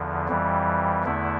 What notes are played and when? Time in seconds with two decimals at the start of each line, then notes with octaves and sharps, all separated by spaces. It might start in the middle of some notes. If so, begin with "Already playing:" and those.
Already playing: E2 D3 F3
0.28 F2 E3 G3
1.04 E2 D3 A3 E4